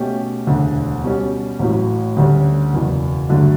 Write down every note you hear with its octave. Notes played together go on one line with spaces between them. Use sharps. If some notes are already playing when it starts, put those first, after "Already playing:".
Already playing: B2 A3 C#4 G4
E1 D2 D3
B2 G3 C#4
A1 A2 F#3
D2 D3 G3 C#4
F#1 E2 B2 F#3
G2 D3 F#3 A3